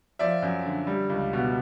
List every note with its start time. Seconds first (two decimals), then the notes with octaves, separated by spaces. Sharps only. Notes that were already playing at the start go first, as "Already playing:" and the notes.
0.19 F3 D5 E5
0.42 F#2
0.66 D3
0.87 G3
1.09 C#2
1.33 B2